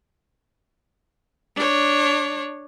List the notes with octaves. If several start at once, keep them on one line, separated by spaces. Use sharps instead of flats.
D4 C#5